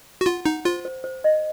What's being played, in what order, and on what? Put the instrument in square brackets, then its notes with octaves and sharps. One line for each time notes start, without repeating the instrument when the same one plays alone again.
[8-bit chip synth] F#4
[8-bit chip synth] F4 [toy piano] F#5
[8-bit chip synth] D#4 [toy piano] F#5
[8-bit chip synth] F4 [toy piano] C5
[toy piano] C5
C5
D#5